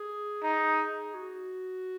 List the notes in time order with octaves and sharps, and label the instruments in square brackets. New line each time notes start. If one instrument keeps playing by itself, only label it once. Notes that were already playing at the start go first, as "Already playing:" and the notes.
Already playing: [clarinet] G#4
[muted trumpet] D#4
[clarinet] F#4